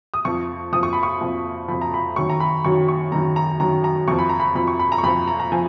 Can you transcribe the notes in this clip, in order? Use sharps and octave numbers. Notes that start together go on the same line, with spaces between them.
D#6
F2 F3 C#6
F2 F3 D#6
C#6
B5
C#6
F2 F3
F2 F3 B5
A#5
B5
F#2 D#3 F#3 C#6
A#5
B5
F#2 D#3 F#3 C#6
C#6
F#2 D#3 F#3 A#5
A#5
F#2 D#3 F#3 A#5
A#5
F2 F3 C#6
B5
A#5
B5
F2 F3 B5
C#6
B5
A#5
C#6
F2 F3 B5
A#5
A#5
F3 G#5